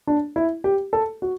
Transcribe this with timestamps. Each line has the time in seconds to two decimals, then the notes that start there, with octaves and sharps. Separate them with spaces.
0.07 D4
0.36 E4
0.64 G4
0.93 A4
1.22 F#4